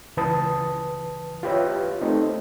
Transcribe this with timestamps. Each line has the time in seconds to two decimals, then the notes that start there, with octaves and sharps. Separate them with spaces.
0.17 C#2 E3 B4 A5 D#6
1.43 F4 G4 B4 C#5 E5
2.01 A3 C4 D#4